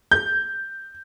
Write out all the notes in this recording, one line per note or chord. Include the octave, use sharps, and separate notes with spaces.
G6